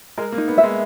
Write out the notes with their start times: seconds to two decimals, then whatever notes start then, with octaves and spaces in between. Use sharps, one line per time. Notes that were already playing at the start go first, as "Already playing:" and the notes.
0.18 G#3 A#4
0.32 A#3
0.38 D#4
0.48 B3
0.58 E5
0.63 G#3